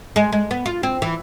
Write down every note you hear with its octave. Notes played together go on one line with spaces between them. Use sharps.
G#3
G#3
B3
F4
C4
E3